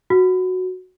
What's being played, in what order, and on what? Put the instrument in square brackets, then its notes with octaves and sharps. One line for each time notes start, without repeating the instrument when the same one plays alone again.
[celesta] F#4